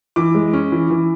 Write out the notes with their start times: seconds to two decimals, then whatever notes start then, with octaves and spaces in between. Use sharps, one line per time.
0.16 E3 D6
0.35 G#3
0.53 C#4
0.72 E3
0.90 E3